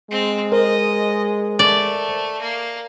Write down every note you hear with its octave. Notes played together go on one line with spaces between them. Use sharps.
G#3 C4
A#4 C5 D#5
A3 D5
A#3